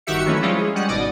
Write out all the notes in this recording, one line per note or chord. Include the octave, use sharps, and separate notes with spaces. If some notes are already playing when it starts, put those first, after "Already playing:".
G1 D#3 F#4 G4 E5 C#7
D#3 E3 F#3 A3 C#4 E4
F3 G3 G#3 C#4 E4 F4
G#3 G#4
G3 G#3 C#4 F#5
G#1 B2 D5 D#5